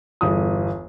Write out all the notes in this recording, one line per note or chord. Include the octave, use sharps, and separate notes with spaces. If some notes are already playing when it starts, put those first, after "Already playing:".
G1 E2 D#6